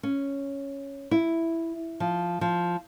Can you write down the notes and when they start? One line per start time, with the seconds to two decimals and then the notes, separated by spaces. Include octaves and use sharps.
0.03 C#4
1.11 E4
2.00 F3
2.41 F3